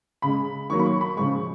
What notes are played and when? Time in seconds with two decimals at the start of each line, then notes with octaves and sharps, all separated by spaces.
0.22 C#3 G#3 B5
0.70 D#3 F#3 A#3 C#6
0.79 B5
0.86 C#6
1.01 B5
1.16 C#3 F3 G#3 C#6